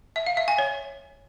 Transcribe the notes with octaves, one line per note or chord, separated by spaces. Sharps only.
E5
F5
E5
G#5
C#5